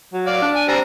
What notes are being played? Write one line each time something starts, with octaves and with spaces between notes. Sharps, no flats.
F#3
D5 F5
D4
G#5
G3 C4 A#5